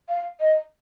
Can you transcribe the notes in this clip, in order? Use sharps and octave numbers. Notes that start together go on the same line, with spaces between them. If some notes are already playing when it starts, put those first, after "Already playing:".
F5
D#5